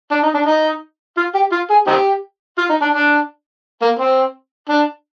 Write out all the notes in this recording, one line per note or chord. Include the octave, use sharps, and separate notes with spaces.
D4
D#4
D4
D#4
F4
G4
F4
G#4
C4 D#4 G4
F4
D#4
D4
D4
A#3
C4
D4